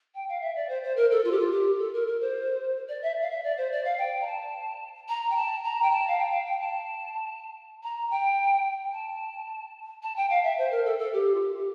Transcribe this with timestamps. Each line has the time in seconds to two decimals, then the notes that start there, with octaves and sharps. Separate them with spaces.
0.14 G5
0.28 F5
0.41 E5
0.55 D5
0.68 C5
0.83 C5
0.96 A#4
1.11 A4
1.24 F4
1.31 G4
1.38 F4
1.51 G4
1.78 A4
1.93 A#4
2.07 A#4
2.20 C5
2.88 D5
3.02 E5
3.21 F5
3.30 E5
3.43 D5
3.57 C5
3.71 D5
3.84 F5
3.98 G5
4.21 A#5
4.26 A5
5.08 A#5
5.30 G5
5.36 A5
5.64 A#5
5.82 G5
5.91 A5
6.07 F5
6.18 G5
6.31 F5
6.45 G5
6.59 A5
7.83 A#5
8.10 G5
8.92 A5
10.02 A5
10.16 G5
10.29 F5
10.43 E5
10.58 C5
10.71 A#4
10.85 A4
10.98 A4
11.12 G4
11.34 F4
11.40 G4
11.57 G4